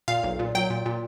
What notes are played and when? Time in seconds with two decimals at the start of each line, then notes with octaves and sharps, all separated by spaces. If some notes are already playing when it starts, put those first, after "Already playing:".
0.08 A#2 F5
0.23 B1
0.39 A#2
0.55 F#3 G5
0.70 A#2
0.86 A#2